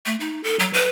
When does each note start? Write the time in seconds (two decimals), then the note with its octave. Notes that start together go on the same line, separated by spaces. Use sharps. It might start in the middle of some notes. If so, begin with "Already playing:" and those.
0.06 A3
0.20 D#4
0.44 A4
0.59 F#3
0.73 B4